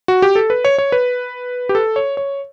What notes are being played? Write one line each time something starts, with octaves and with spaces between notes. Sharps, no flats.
F#4
G4
A4
B4
C#5
C#5
B4
G4
A4
C#5
C#5